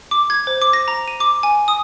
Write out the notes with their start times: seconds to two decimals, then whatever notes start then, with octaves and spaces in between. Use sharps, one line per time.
0.11 D6
0.30 G#6
0.47 C5
0.62 D6
0.73 A#6
0.88 A#5
1.08 D#7
1.20 D6
1.43 G#5
1.68 D#6